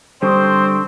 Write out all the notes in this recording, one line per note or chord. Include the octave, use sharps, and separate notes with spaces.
D3 G3 C4 C5 C#6 D#6